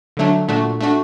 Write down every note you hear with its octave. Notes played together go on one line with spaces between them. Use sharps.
D3 F#3 A3 D4
A#2 A3 D4 F#4
A3 D4 F#4